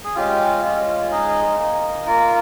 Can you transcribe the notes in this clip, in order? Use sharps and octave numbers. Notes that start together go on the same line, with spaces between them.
G#4
G#3 C#4 F4 G4
G#3 C#4 F4
G#3 D#4 G#4
A#3 D#4
A#3 F4 A#4